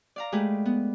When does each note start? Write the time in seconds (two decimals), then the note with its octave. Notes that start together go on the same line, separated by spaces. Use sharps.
0.16 D5 F5 A#5
0.32 G#3 A3 G4 G#4 B4
0.65 B3